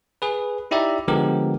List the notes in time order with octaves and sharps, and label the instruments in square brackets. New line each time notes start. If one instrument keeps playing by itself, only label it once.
[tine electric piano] G#4 B4
D#4 E4 G4 D5 E5 A#5
D3 F3 G#3 B3 G4 A#4